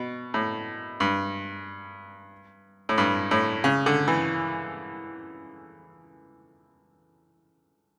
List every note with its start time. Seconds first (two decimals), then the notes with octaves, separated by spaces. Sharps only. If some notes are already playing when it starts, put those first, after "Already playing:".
Already playing: B2
0.34 A2
1.00 G2
2.89 A2
2.98 G2
3.31 A2
3.64 C#3
3.86 D3
4.08 E3